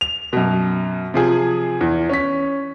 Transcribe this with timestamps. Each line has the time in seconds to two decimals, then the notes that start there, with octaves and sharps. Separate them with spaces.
0.01 F7
0.33 F#2 B2
1.14 C3 F3 G#4
1.81 E2
2.09 C#4 B6